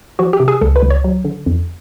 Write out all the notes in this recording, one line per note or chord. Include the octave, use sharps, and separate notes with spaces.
F3 F#4
G4
C3
G#4
C#2 A4
B4
C#2
C#5
F#3
D3
F2